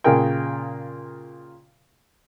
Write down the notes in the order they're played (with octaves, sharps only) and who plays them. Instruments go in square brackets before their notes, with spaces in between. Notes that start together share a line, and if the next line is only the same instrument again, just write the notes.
[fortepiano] A#2 C#3 G#4 A#4 G5